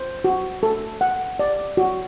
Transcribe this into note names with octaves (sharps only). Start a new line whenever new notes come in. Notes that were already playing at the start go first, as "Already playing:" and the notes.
Already playing: C5
F#4
A4
F#5
D5
F#4